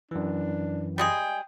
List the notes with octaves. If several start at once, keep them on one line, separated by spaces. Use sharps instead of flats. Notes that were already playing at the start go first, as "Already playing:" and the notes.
F#2 E3 D4
G3 G#3 G#4 G5